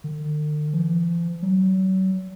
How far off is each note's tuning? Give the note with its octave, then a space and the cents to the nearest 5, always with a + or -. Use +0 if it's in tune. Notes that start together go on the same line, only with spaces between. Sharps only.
D3 +45
F3 -45
F#3 +35